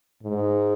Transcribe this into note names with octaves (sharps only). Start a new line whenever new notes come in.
G#2